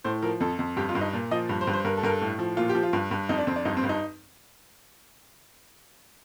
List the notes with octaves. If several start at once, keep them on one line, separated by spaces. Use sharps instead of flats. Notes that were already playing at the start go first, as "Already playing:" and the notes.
A2 C5
F3 A#4
F2 A4
F2
G2 G4
F4
G2
D#4
A#2
F3 D#5
G2
C5
G2
C5
G2 A#4
A4
G2 A#4
A4
A2
F3
A#2 F4
G4
F3
F4
G2
G2
F2 D#4
D4
F2 C4
D4
G2 D#4
C4
G2
D#4